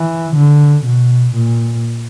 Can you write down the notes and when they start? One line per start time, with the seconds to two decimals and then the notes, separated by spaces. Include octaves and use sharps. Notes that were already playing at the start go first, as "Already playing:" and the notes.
Already playing: E3
0.36 D3
0.85 B2
1.34 A#2